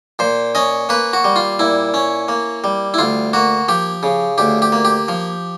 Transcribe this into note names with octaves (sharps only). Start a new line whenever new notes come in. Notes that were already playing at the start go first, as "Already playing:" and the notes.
A#2 C5
C#4 D#5
A#3 B4
F#4
G3
F4
A#2 E4
C#4
A#3
G3
E4
D2 F4
A#3 F#4
F3 G4
C#3
D2 G4
G4
A#3
G4
F3